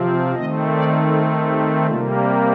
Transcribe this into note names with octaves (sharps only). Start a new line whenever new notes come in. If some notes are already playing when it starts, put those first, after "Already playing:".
Already playing: C3 F3 C4
D#3 A3 C4 D#5
D5
A4
G4
C3 G3 A#3 F4